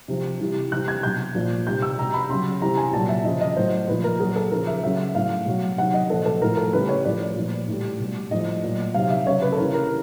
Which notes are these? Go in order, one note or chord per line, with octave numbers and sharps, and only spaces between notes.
C3 F3
C3 E3 G3
C3 E3 G3 F#6
G#6
B2 F#3 G6
A#2 F3
C3 D#3 G3 G6
E6
B2 G3 A#5
B5
C#3 F#3 C6
C3 E3 G3 A#5
G#5
A#2 F#3 A5
E5
C#3 F3 D#5
D#5
A2 F#3 C5
A#2 F3 B4
A#4
A#2 F#3 G#4
A4
C#3 F3 A#4
E5
C#3 F#3 E5
A2 F#3 F5
B2 F#3
C3 D#3 F#3 F#5
D#5
A#2 F3 A4
A4
A2 F3 A#4
A4
C#3 E3 G3 B4
C#5
A2 F3 D5
A#2 F3
A2 E3 G3
B2 G3
A2 F3 D#5
A#2 F#3
C3 D#3 F#3 F5
E5
C#3 F#3 C#5
B4
A4
C#3 E3 G3 A#4
A#4